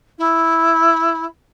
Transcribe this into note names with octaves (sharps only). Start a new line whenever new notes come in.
E4